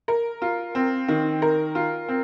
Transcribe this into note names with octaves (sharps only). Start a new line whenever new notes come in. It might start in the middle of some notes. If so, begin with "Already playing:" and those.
A#4
F4
C4
D#3
A#4
F4
C4